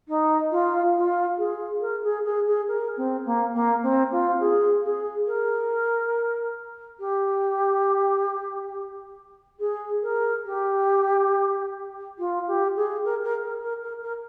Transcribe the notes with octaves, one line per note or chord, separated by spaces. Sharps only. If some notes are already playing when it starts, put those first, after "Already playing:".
D#4
F4
F4
G#4
A#4
G#4
G#4
G#4
A#4
C4
A#3
A#3
C4
F4
G#4
G#4
A#4
G4
G#4
A#4
G4
F4
G4
G#4
A#4
A#4
A#4
A#4
A#4
A#4